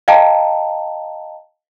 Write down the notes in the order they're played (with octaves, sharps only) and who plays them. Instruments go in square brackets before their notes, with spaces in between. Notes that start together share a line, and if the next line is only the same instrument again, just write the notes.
[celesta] D#5 F5 G5 A5 A#5